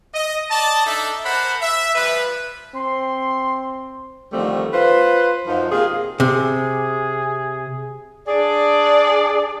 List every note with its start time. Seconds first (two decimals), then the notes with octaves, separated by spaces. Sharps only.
0.14 D#5
0.51 D5 D#5 A5
0.86 D4 D#4 A4 D5 E5
1.24 A#4 C5 F#5 A5 B5
1.61 E5
1.95 F3 G3 B4
2.75 C4 C6
4.33 D3 D#3 F3 G3 A3 C4
4.73 F4 B4 C5
5.47 F#2 F3 D#4
5.71 C3 A#3 F4 G#4
6.20 C3 G#4
8.28 D4 G#4 D5